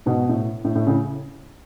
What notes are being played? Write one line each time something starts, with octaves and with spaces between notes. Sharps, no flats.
G#2 B2
A2
A2
A2
A2 C#3